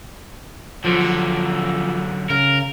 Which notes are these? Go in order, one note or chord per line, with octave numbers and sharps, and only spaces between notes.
F#2 D3 F3
C#3 A#4